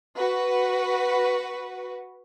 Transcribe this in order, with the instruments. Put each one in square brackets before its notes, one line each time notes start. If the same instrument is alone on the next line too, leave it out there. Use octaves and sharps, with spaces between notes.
[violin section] F#4 B4